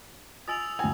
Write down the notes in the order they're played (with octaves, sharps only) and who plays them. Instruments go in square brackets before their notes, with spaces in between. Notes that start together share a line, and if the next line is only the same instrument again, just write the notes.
[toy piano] F4 D#5 G#5 [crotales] D#6 E6 F7
[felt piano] D2 G#5 [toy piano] E4 C#5 G5